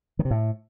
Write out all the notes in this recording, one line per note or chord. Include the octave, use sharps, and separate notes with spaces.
D#3
C3
A2